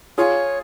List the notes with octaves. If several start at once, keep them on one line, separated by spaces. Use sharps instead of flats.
F4 G#4 C#5